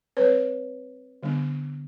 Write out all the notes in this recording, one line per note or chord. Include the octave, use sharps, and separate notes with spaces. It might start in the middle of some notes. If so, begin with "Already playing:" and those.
G3 C4 B4 C#5
D3 G3 B3 D4